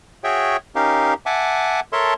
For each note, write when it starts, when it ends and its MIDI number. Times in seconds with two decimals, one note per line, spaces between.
0.24 0.57 66
0.24 0.57 68
0.24 0.57 73
0.24 0.57 76
0.24 0.57 79
0.75 1.14 61
0.75 1.14 63
0.75 1.14 67
0.75 1.14 70
0.75 1.14 77
1.26 1.80 76
1.26 1.80 78
1.26 1.80 80
1.26 1.80 81
1.26 1.80 86
1.93 2.14 69
1.93 2.14 70
1.93 2.14 73
1.93 2.14 76
1.93 2.14 81
1.93 2.14 84